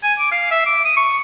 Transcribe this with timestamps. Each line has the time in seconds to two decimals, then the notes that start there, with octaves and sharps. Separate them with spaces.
0.02 G#5
0.19 D6
0.32 F5
0.51 E5
0.66 D6
0.85 D#6
0.97 C#6